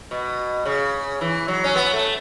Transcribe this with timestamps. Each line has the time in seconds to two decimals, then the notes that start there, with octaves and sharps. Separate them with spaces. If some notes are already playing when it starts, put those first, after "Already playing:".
0.11 B2
0.66 C#3
1.21 E3
1.48 F#3
1.64 C#4
1.76 B3
1.94 A3